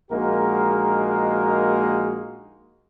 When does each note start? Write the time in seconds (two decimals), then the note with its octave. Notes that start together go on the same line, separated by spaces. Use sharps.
0.11 A#1 G#3 A#3 D#4 F#4 A#4